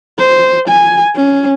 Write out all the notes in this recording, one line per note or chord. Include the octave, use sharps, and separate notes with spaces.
C5
G#5
C#4